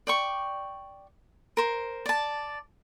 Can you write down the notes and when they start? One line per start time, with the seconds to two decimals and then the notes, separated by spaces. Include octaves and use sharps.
0.07 D5 G5 C#6
1.57 A#4 C5
2.06 D5 A5